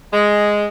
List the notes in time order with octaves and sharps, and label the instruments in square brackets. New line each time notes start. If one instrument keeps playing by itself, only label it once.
[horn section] G#3